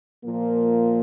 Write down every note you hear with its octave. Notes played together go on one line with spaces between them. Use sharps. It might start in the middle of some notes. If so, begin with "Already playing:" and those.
A#2 F3 A#3